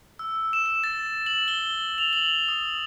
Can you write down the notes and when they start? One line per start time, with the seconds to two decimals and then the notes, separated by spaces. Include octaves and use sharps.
0.19 E6
0.53 E7
0.66 E7
0.84 A6
1.26 F#7
1.48 G7
1.98 F7
2.13 F#7
2.48 D#6